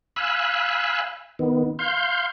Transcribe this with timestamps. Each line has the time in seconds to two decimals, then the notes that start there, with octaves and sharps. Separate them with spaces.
0.16 F5 G#5 B5 E6 F#6
1.39 D#3 B3
1.79 F5 C6 G6